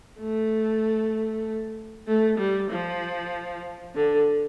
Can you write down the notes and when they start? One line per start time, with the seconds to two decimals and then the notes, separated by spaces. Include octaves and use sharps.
0.20 A3
2.07 A3
2.38 G3
2.70 F3
3.95 D3